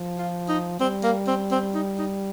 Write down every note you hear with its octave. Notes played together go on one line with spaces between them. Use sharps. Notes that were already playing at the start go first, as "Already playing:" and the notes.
Already playing: F3
F4
D#4
G3 C4
A#3
C4
C4
D#4
D#4